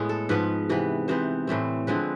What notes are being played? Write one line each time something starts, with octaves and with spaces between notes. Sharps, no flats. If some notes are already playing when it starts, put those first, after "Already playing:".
Already playing: A2 G#3 B3
A4
G#2 F3 B3 B4
C3 E3 B3
C3 E3 B3 C5
A2 E3 A3 C4
D3 F3 G#3 C4 B4